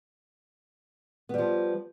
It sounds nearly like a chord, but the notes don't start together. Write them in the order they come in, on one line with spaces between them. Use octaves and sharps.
B3 G3 F3